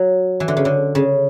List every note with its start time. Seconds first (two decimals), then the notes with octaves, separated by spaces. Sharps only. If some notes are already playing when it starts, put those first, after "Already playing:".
Already playing: F#3
0.40 E3
0.48 D3
0.57 C#3
0.65 D3
0.95 C#3